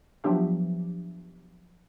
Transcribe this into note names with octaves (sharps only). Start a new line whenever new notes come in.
F3 F#3 B3 D4 G4 E5